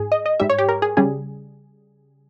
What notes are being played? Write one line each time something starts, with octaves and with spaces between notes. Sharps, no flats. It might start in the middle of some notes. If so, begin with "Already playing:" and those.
Already playing: G#2 G#4
D#5
D#5
G#2 G3 E5
C#5
G4
A#4
G#4
C#3 G3 G#4